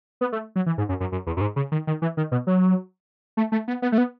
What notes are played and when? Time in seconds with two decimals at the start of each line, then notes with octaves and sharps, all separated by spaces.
0.21 B3
0.32 A3
0.56 F#3
0.66 E3
0.78 G#2
0.89 F#2
1.00 F#2
1.12 F#2
1.27 E2
1.37 F#2
1.41 G#2
1.56 C#3
1.72 D#3
1.87 D#3
2.02 E3
2.17 D#3
2.32 B2
2.47 F#3
3.37 A3
3.52 A3
3.68 B3
3.82 B3
3.92 A3
3.98 B3